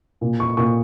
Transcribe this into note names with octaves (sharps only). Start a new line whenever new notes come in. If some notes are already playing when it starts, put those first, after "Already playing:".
A#2
C#6
A#2 C#6